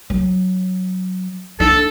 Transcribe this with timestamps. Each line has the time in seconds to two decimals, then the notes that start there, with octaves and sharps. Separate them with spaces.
0.10 F#3
1.60 A#3 D4 A4